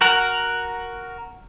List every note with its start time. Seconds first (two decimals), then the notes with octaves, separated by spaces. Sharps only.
0.01 F#4 A#4 F#5